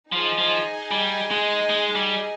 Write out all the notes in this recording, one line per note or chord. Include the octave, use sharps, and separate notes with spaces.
F3 D#4 G#4 D#5 G#5
F3
G3
G#3
G#3
G3